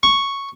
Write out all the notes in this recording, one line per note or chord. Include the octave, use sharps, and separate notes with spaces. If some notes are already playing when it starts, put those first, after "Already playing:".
C#6